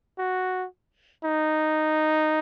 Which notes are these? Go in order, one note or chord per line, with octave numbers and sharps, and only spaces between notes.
F#4
D#4